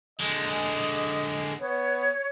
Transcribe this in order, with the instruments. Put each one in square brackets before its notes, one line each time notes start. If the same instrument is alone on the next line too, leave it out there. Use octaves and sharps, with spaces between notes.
[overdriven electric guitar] D3 G#3 [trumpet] D#5
[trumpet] B3 [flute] C#5